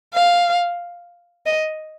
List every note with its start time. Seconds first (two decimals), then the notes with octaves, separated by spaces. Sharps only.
0.14 F5
1.46 D#5